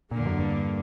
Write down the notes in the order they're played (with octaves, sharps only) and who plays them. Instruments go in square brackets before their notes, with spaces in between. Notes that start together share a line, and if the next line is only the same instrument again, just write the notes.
[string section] E2 D3 A#3 [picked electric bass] A#2
[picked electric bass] F#2
G2